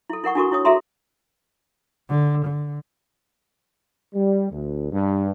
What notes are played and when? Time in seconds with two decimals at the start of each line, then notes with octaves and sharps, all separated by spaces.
0.10 E4 A4
0.24 E4 A#4 F#5 C#6
0.35 D4 E4 F#4 A4 A#4 C#6
0.52 E4 C#5 D#6
0.65 F#4 G#4 A4 E5 A#5 C6
2.10 D3
2.46 D3
4.14 G3
4.51 D2
4.91 G2